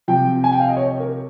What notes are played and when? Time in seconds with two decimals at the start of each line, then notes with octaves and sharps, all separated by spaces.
0.08 C3 F3 G5
0.44 G#5
0.52 G5
0.60 F5
0.69 D#5
0.77 C#5
1.00 A#4